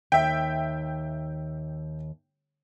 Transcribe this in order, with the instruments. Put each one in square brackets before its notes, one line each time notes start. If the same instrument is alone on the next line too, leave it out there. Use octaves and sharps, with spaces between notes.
[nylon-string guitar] D#2 [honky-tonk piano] E5 G5